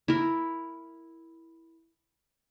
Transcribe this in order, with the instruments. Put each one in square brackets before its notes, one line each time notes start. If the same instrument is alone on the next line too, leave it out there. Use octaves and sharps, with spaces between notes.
[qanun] E4 A#4